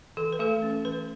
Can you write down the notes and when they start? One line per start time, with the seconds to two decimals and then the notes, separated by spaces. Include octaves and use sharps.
0.17 E3 A4
0.33 B4
0.39 A3 A4
0.62 C#4
0.85 E3 B4